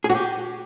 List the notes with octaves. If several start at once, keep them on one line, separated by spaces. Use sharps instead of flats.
G#4
F#4
G4